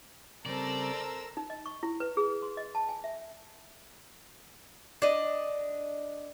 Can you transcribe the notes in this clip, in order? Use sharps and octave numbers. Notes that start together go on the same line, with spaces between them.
C#3 G3 C4 A4 A#4 C5 D5 E6
A#5
D#4
D#5
C#6
E4
B4
G#4
C6
D#5
A5
G#5
E5
D4 D#5